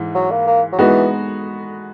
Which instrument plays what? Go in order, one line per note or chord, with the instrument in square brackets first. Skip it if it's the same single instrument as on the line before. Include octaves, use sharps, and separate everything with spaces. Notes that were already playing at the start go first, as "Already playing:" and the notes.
Already playing: [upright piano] G#2 E3
[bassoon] F#3
A#3
A#3
F#3
[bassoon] E3 [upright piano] G#3 B3 D#4 F#4